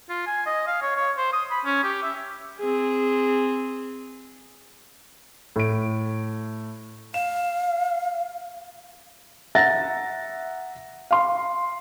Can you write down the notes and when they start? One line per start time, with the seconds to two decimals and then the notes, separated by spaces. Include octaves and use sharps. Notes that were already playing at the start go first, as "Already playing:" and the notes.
0.09 F4
0.27 G#5
0.46 D#5
0.67 F5
0.82 C#5
0.96 C#5
1.17 C5
1.33 D#6
1.51 B5
1.65 C#4
1.84 G4
2.03 E5
2.59 C4 G#4
5.56 A2 D7
7.14 F5 E7
9.55 E5 F#5 A#5 A6 A#6
11.11 F5 C6